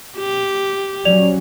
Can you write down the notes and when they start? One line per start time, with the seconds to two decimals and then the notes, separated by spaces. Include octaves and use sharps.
0.18 G4
1.05 F#3 C#4 D5 F7